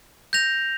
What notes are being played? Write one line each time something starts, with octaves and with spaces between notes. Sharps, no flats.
G6 A#6 F7